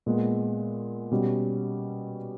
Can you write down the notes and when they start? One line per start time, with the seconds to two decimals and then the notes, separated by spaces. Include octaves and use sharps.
0.06 A#2 G#3 B3
1.11 B2 G3 C#4